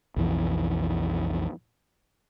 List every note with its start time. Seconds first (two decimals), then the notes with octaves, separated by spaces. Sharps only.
0.16 B1 F2 E3